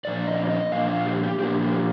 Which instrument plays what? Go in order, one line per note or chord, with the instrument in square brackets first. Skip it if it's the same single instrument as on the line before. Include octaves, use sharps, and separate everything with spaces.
[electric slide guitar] A#2 F3 A#3 D4 D5
D#5
D5
D#5
A#2 F3 A#3 D4 F5
F5
G4
G4
A#2 F3 A#3 D4 G4
G4